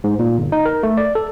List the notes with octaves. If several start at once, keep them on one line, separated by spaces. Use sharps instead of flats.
G#2
A#2
G1
D#4
A#4
A3
D5
A4